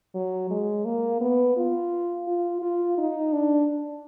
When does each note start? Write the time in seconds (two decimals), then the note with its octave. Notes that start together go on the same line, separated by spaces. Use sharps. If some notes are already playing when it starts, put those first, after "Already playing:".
0.15 F#3
0.50 G#3
0.85 A#3
1.21 B3
1.57 F4
2.28 F4
2.62 F4
2.98 D#4
3.33 D4